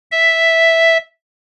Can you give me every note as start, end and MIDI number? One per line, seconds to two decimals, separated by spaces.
0.12 0.98 76